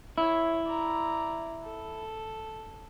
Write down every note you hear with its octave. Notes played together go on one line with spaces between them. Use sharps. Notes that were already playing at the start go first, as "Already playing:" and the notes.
E4 C#5
D5 A#5
A4